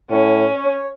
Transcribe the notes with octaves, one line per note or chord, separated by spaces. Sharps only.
A2 C#4
C#5